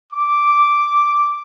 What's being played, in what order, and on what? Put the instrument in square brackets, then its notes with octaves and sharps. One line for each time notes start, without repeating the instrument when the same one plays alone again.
[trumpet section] D6